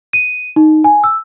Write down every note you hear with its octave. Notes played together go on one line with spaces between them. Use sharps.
D#7
D#4
G#5
E6